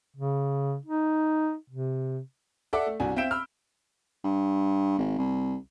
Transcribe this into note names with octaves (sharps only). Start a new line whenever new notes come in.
C#3
D#4
C3
A4 D5 E5 F#5 D6
A3
C2 D4 F#4 G#5
C4 E5 F5 G6 D7 E7
B5 E6 F6
G2
G#1
C2